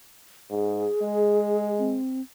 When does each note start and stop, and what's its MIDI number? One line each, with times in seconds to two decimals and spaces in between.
0.51 0.88 44
0.51 1.72 68
1.01 1.99 56
1.79 2.21 60